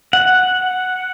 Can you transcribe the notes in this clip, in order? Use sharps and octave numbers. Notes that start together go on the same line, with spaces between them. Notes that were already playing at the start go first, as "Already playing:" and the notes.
F#5